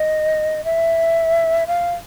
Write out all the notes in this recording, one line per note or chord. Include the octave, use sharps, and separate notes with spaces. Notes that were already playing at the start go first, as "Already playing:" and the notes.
Already playing: D#5
E5
F5